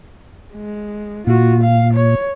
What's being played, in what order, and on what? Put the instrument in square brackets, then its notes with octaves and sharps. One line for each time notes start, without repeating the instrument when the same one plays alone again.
[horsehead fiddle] G#3
[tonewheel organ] A#2 [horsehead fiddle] F4 F#4
[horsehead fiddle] F5
C#5